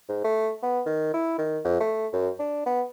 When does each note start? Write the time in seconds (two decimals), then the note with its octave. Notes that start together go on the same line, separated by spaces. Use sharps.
0.09 G#2
0.24 A3
0.63 B3
0.86 D#3
1.14 E4
1.38 D#3
1.64 F2
1.80 A3
2.13 F#2
2.39 D4
2.66 B3